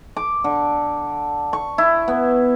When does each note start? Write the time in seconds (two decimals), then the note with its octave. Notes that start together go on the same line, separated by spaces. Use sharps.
0.17 D6
0.44 D3
1.53 C#6
1.78 E4
2.08 B3